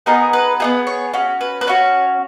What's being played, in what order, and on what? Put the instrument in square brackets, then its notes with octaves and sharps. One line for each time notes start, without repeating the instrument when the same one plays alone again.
[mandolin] B3 D#4 G#4 A#4
B4
B3 D#4 G#4 B4
C#5
C#4 F#4
B4
B4
C#4 F#4 C#5